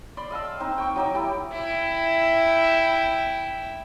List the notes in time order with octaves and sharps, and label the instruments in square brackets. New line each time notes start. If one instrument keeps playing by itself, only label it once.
[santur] D5 B5 C6
D#5 F5 A5 E6
C4 D#4
G5 C#6
F#3 D#4 D6
E4 G4 G5 A5
[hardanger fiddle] E4 G5